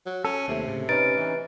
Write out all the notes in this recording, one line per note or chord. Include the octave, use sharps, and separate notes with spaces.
F#3
C#4 A4
D#2 C3 A3
A2 C#3
C#4 D#4 B4 A6 D7
E3